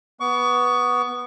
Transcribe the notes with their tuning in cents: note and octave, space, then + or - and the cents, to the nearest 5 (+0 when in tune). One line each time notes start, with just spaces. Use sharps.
B3 -5 C#6 +25